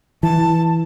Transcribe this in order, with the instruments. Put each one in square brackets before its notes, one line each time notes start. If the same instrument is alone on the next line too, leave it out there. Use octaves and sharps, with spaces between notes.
[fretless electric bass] E3 [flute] A5